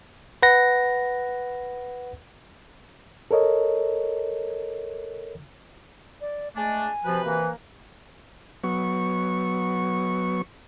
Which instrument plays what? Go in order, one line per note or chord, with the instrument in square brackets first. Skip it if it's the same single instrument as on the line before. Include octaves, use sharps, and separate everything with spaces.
[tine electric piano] B4 F#5 A#6
[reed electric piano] A4 A#4 C#5 D#5
[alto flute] D5
[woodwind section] G#3 A3 D4 [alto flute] G#5
[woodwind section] C3 F#4 B4 [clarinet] F3
[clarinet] E3 [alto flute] A#3
[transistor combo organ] F#3 B3 C#6